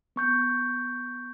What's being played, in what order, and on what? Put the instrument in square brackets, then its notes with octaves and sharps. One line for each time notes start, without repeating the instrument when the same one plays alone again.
[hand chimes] B3 C#6 G6